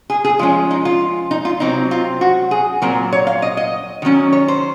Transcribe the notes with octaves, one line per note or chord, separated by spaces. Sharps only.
G#4
G#4
F3 G#3 C#4 F4
D#4
F4
D#4
F4
C3 F#3 C4 D#4
F4
F#4
G#4
A#2 F#3 C4 A#4
C#5
F5
D#5
D#5
D#3 F#3 C#4
C#5
C5